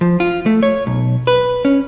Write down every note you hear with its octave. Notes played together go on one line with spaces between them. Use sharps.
F3
F4
A3
C#5
B1
B4
C#4